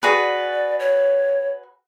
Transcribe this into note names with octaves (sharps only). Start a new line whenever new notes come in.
F#4 G#4 B4 D5
C#5